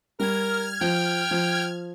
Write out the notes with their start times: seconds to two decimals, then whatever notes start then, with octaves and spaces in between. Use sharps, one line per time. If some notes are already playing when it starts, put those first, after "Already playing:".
0.20 G3 A#4 F6 G#6
0.81 F3 G5
1.31 F3